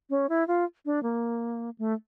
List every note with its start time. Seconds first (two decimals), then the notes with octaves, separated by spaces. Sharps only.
0.10 C#4
0.29 E4
0.47 F4
0.85 D4
1.03 A#3
1.78 A3